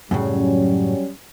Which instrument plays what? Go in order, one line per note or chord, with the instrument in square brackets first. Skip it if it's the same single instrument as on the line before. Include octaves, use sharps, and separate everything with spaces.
[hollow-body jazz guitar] F#2 A2 C#3 [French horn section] F#3 G3 C#4